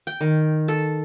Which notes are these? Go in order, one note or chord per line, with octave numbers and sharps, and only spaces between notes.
G5
D#3
A4